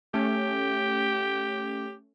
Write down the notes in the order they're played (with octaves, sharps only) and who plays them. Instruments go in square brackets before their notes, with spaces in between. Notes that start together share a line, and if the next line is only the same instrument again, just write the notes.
[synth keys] A3 C#4 [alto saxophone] G4